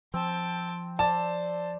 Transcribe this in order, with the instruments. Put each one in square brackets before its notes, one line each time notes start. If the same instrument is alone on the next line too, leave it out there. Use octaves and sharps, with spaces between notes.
[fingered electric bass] F3 [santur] C4 [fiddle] G5 A5
[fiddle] C5 [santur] D5 [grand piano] A5